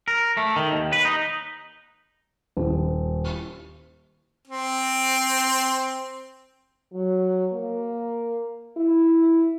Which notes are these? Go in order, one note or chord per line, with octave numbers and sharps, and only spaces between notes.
A#4
A3
D#3
D#2
B4
D#4
D#1
C4
F#3
A#3
E4